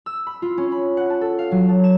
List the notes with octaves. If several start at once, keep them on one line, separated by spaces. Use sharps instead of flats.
E6
B5
F4
C#4
B5
F#5
A5
A4
F5
F#3
A5
E7